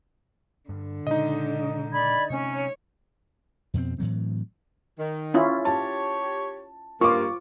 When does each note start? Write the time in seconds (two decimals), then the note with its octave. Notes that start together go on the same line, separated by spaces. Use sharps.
0.69 G2 D3
1.07 A#2 C#3 G#3 D#4 D#5
1.92 D5 B5 G#6
2.30 C3 A3 C4 C#4 C#5
3.74 F2 B2 A#3 C4
3.98 A2 E3 F#3 C4
4.98 D#3
5.34 C#4 E4 F4
5.65 G4 C#5 A5
7.01 G2 A#3 F4 C#6 D6